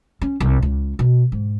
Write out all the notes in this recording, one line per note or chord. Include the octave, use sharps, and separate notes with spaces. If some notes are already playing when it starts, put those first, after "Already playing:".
C#4
C2
C#2
B2
G#2